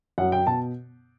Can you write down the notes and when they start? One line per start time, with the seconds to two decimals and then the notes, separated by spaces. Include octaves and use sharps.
0.18 F#2 F#3 F#5
0.32 G5
0.47 B2 A5